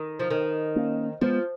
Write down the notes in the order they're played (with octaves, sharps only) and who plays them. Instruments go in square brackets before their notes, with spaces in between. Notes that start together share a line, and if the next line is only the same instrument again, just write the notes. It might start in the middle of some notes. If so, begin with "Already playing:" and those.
Already playing: [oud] D#3
F3
D#3
[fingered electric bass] A#3 C#4
[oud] F3 [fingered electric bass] G#3 B3